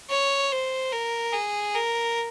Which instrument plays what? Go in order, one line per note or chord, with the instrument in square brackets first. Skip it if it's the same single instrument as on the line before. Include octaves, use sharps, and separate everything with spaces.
[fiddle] C#5
C5
A#4
G#4
A#4